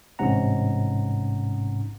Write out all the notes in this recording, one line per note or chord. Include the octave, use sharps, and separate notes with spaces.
A1 G#2 C3 C#4 F#5 A#5